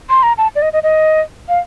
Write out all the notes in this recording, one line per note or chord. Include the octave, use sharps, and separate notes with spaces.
C6
A#5
A5
D5
D#5
D#5
D#5
F5